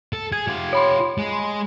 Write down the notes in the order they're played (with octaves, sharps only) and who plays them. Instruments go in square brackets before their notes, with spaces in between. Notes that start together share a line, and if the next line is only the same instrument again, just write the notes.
[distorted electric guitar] A4
[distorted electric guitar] G#4 [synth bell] G#6
[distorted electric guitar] F4 G4
[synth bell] C#5 B5 C6
[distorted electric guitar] G#3